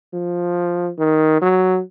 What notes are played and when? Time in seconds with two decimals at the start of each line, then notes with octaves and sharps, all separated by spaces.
0.13 F3
0.98 D#3
1.41 F#3